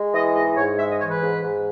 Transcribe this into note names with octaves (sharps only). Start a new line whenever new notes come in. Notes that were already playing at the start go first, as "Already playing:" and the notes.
Already playing: G#3
E3 D#5
G#2 D#5
G#2 C#5
G#3 E5
D#5
E3 C#5
B4
G#2
G#2